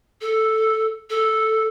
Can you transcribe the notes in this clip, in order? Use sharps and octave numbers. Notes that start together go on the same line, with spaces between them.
A4
A4